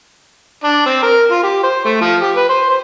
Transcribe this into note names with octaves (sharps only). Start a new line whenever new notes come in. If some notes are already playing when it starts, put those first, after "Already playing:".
D4
C4
A#4
F4
G4
C5
A3
F3
G4
B4
C5
C5